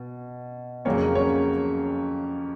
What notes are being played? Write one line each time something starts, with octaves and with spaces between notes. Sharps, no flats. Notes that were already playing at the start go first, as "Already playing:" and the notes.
Already playing: B2
F2 C#3 F#3 A#3 C#4 C#5
C#4 C#5